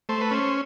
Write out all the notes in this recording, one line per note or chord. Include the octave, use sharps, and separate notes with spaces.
A3 C5
B4
C#4 C5